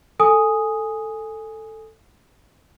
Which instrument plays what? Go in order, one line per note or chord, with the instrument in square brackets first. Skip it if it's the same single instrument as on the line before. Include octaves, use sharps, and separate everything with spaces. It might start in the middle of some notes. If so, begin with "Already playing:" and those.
[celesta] A4 G#5 D#6